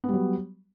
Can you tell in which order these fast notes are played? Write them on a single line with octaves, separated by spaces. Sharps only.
B3 G3 F#3